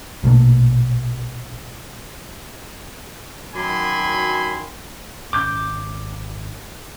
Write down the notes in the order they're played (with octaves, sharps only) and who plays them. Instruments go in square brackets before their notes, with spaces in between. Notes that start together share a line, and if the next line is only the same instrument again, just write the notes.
[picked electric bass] A#1 B2 A3 A#3
[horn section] F#2 D#3 F#3 G#5 B5 C6
[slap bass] G#1 C#4 [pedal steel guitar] D6 G6